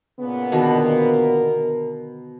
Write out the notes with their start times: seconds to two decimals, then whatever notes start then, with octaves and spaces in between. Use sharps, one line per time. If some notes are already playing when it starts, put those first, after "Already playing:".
0.20 A#2 C#3 B3
0.52 B2 D3 D#3 A#4